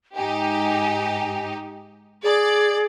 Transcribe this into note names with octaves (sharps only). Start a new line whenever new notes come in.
G#2 D#4 G4 G#5
G#4 D5